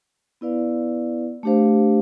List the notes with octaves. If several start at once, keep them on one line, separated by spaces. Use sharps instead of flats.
B3 E4 B4 D5 F5
A3 D4 G4 C5 F5